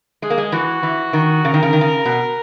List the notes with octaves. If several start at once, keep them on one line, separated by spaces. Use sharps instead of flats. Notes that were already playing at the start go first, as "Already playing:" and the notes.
G#3 G#4
A#3
G#3
E3 F#4
E3
D#3
C#3 A#4
D#3
C#3
D#3
C#3
B2